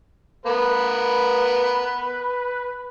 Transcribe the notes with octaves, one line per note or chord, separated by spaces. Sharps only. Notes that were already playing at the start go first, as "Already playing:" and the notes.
B3 A#4 B4